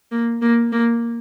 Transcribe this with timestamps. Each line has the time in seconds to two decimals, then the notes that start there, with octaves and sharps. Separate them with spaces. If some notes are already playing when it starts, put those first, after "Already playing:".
0.12 A#3
0.42 A#3
0.72 A#3